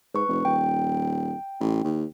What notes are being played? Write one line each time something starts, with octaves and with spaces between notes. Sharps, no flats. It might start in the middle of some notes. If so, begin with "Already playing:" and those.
G#2 B4 C#6
F1
D#1 G5
A1
D#2